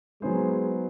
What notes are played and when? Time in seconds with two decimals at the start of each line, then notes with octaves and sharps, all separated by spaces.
0.22 F#3 G#3 B3 D#4 G#4 C5